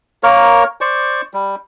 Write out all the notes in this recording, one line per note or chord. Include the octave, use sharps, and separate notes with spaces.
A#3 A#4 C#5
C5 D5 C#6
G3